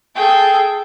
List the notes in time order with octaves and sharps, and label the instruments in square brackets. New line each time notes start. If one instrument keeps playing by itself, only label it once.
[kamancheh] G#4 A4 [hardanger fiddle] G5